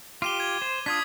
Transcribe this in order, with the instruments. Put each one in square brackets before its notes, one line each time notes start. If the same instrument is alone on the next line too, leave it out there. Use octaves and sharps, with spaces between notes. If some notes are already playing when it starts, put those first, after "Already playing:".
[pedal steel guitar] F4 G4 [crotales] D6 D#7 G7
[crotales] G#6
[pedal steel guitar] C5
[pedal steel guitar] D4 F4 [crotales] D#6 G#6 B6